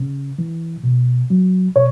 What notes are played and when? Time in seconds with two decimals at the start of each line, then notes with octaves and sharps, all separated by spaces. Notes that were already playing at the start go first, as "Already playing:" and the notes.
Already playing: C#3
0.39 E3
0.84 B2
1.30 F#3
1.75 B2 C#5